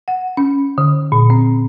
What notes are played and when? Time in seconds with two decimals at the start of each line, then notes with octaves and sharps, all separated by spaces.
0.08 F#5
0.37 C#4
0.78 D3
1.12 A#2
1.30 C4